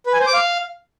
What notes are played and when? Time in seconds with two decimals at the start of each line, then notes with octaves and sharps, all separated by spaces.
0.06 B4
0.13 G#5
0.20 C5
0.27 D6
0.33 F5